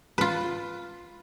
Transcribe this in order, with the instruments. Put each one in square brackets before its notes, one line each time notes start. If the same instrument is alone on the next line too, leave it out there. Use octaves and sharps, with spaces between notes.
[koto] F4 B4